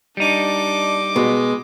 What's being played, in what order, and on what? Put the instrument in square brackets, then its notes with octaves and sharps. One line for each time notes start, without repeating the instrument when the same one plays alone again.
[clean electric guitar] G3 D#4 [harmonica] D4 [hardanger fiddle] D#5 D6
[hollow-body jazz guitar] B2 [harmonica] G#3